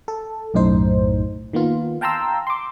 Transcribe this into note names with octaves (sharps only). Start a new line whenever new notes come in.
A4
B1 F#2 A2 D#4 C5
D#3 A#3 B3 F4
F5 G5 A5 A#5 C6 E6
C6 D6